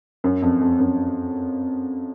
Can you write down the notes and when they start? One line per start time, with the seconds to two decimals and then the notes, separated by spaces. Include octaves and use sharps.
0.24 F#2
0.42 F2
0.61 F2
0.80 F#2